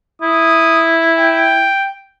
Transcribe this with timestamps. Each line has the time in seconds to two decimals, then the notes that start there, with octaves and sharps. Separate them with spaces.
0.22 E4 D#6
1.19 G5